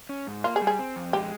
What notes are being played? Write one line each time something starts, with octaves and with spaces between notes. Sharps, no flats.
C#4
G#2
A#3 F4
G#4
G3
G#4
C4
F2
G#3 G4